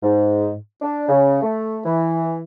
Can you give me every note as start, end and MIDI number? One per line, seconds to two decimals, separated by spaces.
0.03 0.54 44
0.82 1.06 62
1.09 1.41 49
1.43 1.79 57
1.86 2.38 52